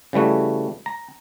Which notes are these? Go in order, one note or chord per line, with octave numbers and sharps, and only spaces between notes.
C#3 E3 G3 A3 F#4
A#5